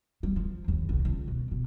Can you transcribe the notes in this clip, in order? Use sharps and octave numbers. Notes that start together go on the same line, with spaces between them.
G3
F3
D#2
C2
C#2
B2
B2